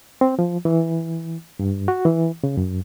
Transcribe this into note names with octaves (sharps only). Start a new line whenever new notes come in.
C4
F3
E3
G2
F#4
E3
C#3
F#2